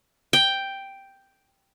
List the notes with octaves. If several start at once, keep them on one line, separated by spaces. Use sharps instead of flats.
G5